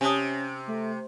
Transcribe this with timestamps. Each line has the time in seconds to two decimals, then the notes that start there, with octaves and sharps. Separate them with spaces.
0.01 C3 C#4 G#5 A5 D#6
0.68 A3